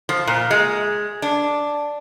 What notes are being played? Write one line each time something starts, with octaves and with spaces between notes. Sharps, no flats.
F3
A#2
G#3
D4